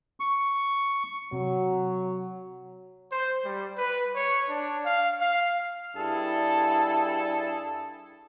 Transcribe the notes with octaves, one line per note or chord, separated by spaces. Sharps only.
C#6
C3 F#3
C5
G3
B4
C#5
D4
F5
F5
G2 E4 G#4 A4